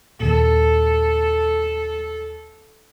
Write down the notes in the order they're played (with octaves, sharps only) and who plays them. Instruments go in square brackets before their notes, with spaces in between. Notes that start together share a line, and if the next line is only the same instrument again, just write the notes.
[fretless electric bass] D#2 A#2 [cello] A4